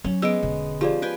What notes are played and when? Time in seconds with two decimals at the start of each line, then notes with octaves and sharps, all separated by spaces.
0.04 F#3 C#4
0.22 G#3 B3 E6 D7
0.43 E1 D3
0.81 F3 G4 G#4 D5
1.02 B4 G5 G#5